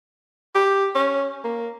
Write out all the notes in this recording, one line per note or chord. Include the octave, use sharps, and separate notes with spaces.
G4
C#4
A#3